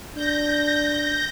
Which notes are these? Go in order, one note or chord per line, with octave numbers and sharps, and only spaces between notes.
D4 G6 A#6